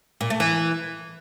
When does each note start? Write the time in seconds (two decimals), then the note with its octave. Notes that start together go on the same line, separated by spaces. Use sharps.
0.21 A#2
0.30 A3
0.40 E3